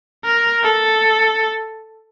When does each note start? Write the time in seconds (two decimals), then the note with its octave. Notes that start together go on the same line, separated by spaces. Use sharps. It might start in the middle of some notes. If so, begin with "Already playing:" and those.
0.24 A#4
0.64 A4